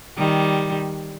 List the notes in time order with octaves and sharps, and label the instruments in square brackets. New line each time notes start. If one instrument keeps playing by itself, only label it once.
[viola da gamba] D#3 G3